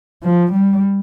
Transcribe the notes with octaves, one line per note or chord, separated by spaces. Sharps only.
F3
G3